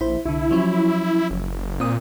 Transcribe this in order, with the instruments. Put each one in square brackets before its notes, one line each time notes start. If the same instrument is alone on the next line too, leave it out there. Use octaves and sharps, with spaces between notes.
[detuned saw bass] A#1 [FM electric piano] E4 C5
[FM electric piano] C2 D3 [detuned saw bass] E4
[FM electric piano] F3 F#3 C#4
[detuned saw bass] F#1
[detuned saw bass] A#2 [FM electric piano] C4 D#6